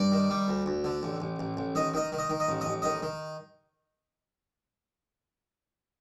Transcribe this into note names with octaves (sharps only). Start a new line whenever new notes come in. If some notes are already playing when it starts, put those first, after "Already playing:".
Already playing: G2 D5
D#3
G3
D2
D2
D3
A1
A1
A1
A1
D#3 D#5
D#3 D#5
D#3
D#5
D#3
D#5
A1
D#5
A1
D#3 D#5
D#3